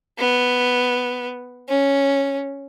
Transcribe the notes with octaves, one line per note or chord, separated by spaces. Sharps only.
B3
C#4